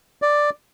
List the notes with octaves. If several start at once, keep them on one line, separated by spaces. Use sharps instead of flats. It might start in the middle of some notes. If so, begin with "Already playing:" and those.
D5